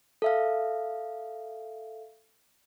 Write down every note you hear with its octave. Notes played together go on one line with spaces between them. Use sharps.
A4 E5 F5